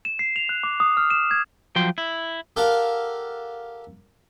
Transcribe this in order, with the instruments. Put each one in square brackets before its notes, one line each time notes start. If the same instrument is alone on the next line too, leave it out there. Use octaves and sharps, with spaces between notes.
[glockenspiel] E7
C7
F7
F#6
D6
D#6
F6
E7
G#6
[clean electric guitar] F3 F#3 G5 C6
E4
[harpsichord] G4 A4 A#4 F5 F#5